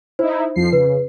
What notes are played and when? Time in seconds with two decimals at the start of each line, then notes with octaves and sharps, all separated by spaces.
0.19 D#4 E4 C5
0.56 F2 F3 C7
0.73 C#3 B4